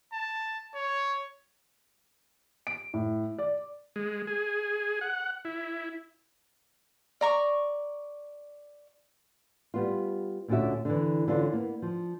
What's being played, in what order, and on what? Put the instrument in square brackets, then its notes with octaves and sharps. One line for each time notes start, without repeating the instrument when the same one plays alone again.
[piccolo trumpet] A5
C#5
[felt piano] D7
A2
D5
[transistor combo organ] G#3
G#4
F#5
E4
[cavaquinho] D5 A#5 C#6
[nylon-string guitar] G3 B3 F4
D2 A#2 D3 C#4 F#4 E5
D3 E3
D3 E3 C#4 D4 F4
A#3 B3
F3